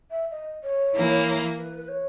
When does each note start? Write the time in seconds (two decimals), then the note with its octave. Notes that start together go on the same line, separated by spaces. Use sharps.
0.10 E5
0.31 D#5
0.63 C#5
0.94 E3 A#3 E4
1.57 B4
1.77 B4
1.88 C#5